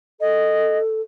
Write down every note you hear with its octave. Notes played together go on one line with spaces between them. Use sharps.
A4 D#5